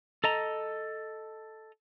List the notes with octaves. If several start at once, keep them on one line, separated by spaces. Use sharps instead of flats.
A4 D#5 A#5